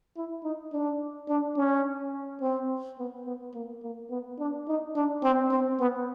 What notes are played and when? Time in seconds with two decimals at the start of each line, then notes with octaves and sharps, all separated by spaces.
0.17 E4
0.44 D#4
0.73 D4
1.29 D4
1.56 C#4
2.42 C4
2.99 B3
3.26 B3
3.54 A#3
3.83 A#3
4.10 B3
4.39 D4
4.68 D#4
4.96 D4
5.23 C4
5.51 C4
5.79 B3